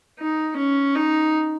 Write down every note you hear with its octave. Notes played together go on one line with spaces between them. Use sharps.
D#4
C#4
D#4